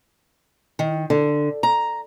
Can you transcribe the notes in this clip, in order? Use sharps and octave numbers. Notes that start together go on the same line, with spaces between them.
D#3
D3
A#5